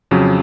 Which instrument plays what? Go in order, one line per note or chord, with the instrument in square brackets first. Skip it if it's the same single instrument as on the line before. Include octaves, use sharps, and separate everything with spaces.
[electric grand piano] F2 C#3 F#3